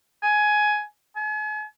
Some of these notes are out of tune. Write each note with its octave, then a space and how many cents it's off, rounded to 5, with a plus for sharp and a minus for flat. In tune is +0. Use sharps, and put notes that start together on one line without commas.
G#5 +15
G#5 +40